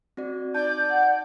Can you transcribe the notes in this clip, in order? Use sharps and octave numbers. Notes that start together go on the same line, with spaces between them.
C4 F#4 D5
D#4 D5 A5 G6
F#5